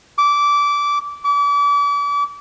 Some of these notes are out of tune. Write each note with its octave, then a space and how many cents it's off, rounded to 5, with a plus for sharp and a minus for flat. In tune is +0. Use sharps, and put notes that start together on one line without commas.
D6 -20
D6 -40